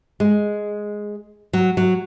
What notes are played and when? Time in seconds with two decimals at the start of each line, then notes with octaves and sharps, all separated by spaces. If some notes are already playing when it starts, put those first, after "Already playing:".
0.20 G#3
1.53 F#3
1.77 F#3